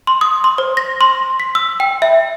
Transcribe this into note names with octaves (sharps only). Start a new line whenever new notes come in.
C6
D#6
C6
C5
A#6
C6
B6
E6
G5
E5